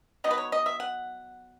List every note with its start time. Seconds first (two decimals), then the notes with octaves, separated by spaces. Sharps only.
0.24 F#3 B3 D#4 D#5
0.31 B4
0.38 C#5
0.52 D#5
0.66 E5
0.80 F#5